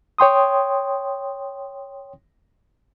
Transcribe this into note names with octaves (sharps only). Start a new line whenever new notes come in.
C#5 G5 C6 D#6